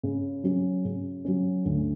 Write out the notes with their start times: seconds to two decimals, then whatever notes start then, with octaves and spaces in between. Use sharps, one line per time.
0.03 C#3
0.44 F#3 C#4
0.85 C#3
1.25 F#3 C#4
1.65 D2